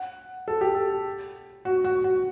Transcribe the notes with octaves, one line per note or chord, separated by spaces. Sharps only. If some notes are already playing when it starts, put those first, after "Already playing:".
Already playing: F#5
A4
G4
A4
F#4
F#4
F#4